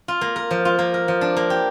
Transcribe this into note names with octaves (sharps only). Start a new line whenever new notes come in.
F4
A#3
A#4
F3
F4
A#3
A#4
F3
D4
A#3
G4